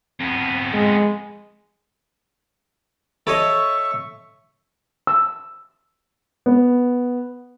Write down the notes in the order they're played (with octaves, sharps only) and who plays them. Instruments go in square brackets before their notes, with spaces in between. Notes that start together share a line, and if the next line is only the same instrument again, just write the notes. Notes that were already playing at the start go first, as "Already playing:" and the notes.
[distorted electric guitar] F2 B3
[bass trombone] G#3
[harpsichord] A4 C#5 D#5 [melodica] E5 C#6
[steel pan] E6
[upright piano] B3